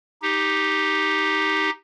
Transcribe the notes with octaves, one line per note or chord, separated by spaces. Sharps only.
D#4 G4